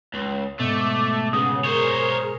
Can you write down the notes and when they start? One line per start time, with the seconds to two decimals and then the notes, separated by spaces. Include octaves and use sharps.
0.14 C#2
0.60 G#2 B2 A3 D6
1.33 C#3 G#4 B4 F#5 D#6
1.64 G#4 A#4 C5 C#5